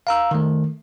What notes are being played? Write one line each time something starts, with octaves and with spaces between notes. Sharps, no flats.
F5 A#5 E6
D#3 A3